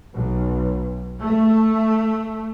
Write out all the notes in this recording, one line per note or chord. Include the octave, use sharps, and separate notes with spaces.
B1
A3